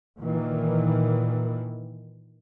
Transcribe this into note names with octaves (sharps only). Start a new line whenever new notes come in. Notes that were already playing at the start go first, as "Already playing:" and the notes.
A#2 D#3 E3